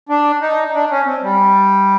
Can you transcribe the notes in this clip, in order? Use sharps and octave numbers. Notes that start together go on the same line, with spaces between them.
D4
D#4
D4
C#4
C4
G3